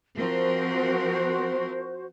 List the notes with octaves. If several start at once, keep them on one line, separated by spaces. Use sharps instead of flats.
F3 C4 F#4 A#4 C5